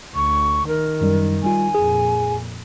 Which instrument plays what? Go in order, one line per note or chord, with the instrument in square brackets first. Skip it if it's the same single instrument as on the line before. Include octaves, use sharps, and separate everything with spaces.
[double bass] D2 [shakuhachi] C#6
[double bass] D#3 [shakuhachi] A#4
[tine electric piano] F#2 G3
[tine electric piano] G3 F4 [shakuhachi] G#5
[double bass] F2 A#2 [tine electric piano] G#4